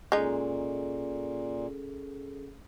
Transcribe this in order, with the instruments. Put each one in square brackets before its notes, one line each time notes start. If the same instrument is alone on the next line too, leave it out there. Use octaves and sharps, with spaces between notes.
[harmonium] A#2 [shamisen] G#3 D#4 [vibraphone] C#4 G#4 A4